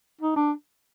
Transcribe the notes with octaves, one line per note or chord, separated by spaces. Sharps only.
D#4
D4